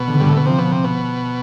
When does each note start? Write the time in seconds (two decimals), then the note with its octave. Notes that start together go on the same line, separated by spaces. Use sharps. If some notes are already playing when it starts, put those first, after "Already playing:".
Already playing: B2
0.08 D3
0.20 G2
0.29 A2
0.37 B2
0.46 C3 F3
0.58 B2
0.72 C3
0.84 B2